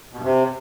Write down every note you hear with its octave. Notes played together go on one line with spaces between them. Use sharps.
B2
G2
C3